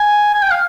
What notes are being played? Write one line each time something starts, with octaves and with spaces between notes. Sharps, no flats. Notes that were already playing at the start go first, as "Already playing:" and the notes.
Already playing: G#5
G#5
G5
F5